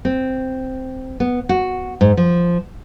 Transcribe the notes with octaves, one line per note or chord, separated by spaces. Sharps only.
C4
B3
F#4
G#2
F3